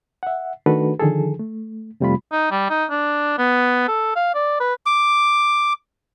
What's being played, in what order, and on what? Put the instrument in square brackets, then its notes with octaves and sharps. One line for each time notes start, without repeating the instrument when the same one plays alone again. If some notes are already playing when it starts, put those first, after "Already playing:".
[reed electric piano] E5 F#5
D#3 A3 D4 F#4 A4 B4
D3 D#3 F3 G#4 A4
A3
F2 C3 G3 A3 F4 B5
[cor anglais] D#4
G3
D#4
D4
B3
A4
F5
D5
B4
[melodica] D6